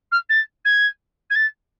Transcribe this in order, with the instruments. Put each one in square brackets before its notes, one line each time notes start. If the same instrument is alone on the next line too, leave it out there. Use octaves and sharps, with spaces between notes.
[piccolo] F6
A6
G#6
G#6
A6